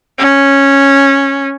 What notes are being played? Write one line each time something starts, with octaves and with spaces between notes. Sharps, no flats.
C#4